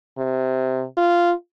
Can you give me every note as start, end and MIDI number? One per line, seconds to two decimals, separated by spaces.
0.18 0.83 48
0.97 1.33 65